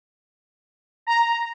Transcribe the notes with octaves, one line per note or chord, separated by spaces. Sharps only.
A#5